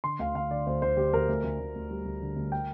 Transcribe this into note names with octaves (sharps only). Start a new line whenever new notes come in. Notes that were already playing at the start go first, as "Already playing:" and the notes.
D3 C6
D2 F5
D2 F5
D3 D5
D2 C5
D2 C5
D2 G4
D2 A#4
D2
D2
D2
D2
G3
D2
D3
D2
G5